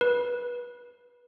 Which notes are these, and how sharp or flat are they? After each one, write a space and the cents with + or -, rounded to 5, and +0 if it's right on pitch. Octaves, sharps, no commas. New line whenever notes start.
B4 -25